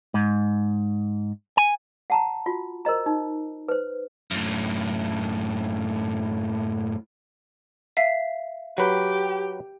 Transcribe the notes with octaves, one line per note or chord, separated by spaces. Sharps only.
G#2
G#5
F#5 A5 A#5
F4 F#4
A#4 C5 D#5 A#5
D#4
B4 C5
F#2 A2
E5 F5
F#3 G4 B4